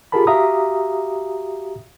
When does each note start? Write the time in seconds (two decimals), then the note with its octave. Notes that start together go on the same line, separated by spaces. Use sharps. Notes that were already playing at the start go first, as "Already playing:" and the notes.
0.12 F4 G4 G#4 A#4 A5 B5
0.27 F#4 G4 E5 F5 A#5 D#6